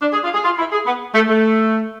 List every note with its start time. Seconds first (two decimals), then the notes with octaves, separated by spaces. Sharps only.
0.02 D4
0.13 G#4
0.24 F4
0.35 G#4
0.45 F4
0.59 E4
0.73 G#4
0.87 B3
1.15 A3
1.29 A3